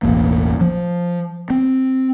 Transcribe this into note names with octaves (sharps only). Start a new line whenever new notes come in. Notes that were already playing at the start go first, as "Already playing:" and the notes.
E1 A1 F#2 A#3
F3
C4